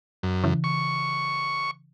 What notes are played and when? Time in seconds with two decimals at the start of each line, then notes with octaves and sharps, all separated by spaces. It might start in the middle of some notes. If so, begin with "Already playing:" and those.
0.23 F#2
0.44 C#3 E3
0.64 C#6